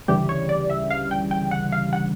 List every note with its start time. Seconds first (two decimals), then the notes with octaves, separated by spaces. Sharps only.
0.08 D2 C#3 E3 G3 G4
0.29 C#5
0.49 D5
0.70 E5
0.90 F5
1.11 G5
1.31 G5
1.51 F#5
1.72 F5
1.93 F#5